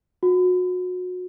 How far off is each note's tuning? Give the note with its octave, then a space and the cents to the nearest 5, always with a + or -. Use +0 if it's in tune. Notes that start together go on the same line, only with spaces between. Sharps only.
F#4 -30